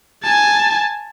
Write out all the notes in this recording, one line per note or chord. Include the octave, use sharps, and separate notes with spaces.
G#5 A5